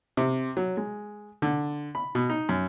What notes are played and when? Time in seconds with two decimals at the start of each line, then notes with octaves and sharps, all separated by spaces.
0.17 C3
0.57 F#3
0.77 G#3
1.42 D3
1.95 B5
2.15 B2
2.30 D#4
2.49 F#2